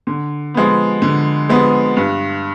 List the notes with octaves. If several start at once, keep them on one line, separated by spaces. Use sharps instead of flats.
D3
F3 G#3 B3
D3
F3 G#3 B3
G2